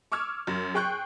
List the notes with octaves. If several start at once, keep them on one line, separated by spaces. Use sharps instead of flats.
C#6 D6 E6 F6 G#6
F#2
G#4 G5 C#6 F#6 G6